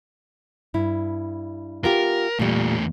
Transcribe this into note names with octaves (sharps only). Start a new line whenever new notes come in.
G2 E4
B3 F4 G4 A#4
E2 A#2 G3 A3